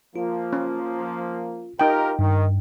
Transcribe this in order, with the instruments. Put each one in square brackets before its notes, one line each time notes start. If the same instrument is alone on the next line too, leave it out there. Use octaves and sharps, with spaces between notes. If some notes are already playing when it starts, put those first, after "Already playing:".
[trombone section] F3 A#3 [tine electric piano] F4
[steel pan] C#4
[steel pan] D#4 G5 [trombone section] F4 G4 A#4
[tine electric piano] G2 [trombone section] D#3